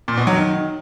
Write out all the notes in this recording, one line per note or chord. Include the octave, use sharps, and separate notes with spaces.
A#2
B2
F#3
D#3